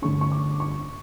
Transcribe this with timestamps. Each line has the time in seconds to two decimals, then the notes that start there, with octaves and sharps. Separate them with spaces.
0.02 G1 G2 D3 A3 C#4 C#6
0.21 C#6
0.32 D6
0.60 C#6